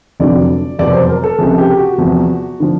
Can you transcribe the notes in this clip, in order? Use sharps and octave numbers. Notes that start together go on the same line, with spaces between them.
F1 F2 D3 F#3 D5
F1 E2 B2 F#3 D5
C5
A#4
A4
C#2 C3 F3 G#4
G4
F#4
E2 C3 F3
D3 F3